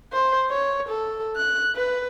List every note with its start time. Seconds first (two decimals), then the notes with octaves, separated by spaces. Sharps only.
0.13 C5
0.50 C#5
0.88 A4
1.36 F#6
1.76 B4